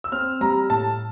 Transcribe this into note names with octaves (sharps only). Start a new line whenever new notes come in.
E6
C4 F6
G3 A#5
A2 A5